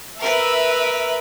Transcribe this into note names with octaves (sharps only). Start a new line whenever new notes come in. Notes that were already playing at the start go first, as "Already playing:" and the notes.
A#4 B4 E5